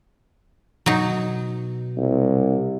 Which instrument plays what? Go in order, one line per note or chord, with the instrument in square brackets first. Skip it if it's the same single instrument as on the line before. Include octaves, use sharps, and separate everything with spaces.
[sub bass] B2 [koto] F#3 D#4
[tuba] C2